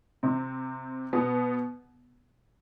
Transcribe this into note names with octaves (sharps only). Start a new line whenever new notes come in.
C3 C4
B2 B3